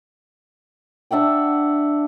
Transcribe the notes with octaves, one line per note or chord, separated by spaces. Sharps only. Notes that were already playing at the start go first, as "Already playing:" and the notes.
D4 E5 F#5 G5